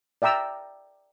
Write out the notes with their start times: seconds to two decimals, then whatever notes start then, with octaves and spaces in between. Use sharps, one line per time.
0.22 D5 E5 G5 A#5 E6